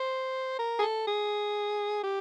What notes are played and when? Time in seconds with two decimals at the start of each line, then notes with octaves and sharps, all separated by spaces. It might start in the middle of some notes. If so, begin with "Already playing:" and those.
Already playing: C5
0.59 A#4
0.79 G#4
0.82 A4
1.07 G#4
2.03 G4